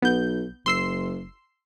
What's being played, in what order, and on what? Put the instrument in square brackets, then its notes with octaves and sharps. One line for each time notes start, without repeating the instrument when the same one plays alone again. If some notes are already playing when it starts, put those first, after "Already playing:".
[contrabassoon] B1 [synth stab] B3 G6
[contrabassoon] F#1 [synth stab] C6 E6 C7